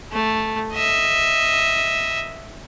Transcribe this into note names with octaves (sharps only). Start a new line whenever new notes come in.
A3
D#5 E5